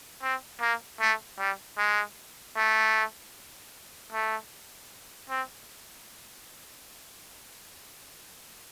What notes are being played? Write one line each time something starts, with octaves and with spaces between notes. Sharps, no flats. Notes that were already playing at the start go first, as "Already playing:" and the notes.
C4
A#3
A3
G3
G#3
A3
A3
C4